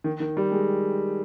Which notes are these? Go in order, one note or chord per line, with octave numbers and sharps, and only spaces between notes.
D#3
D#3
G3
G#3